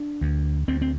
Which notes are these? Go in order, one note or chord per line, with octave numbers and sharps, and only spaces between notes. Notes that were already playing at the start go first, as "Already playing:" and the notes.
Already playing: D4
D2
D2 C4
C4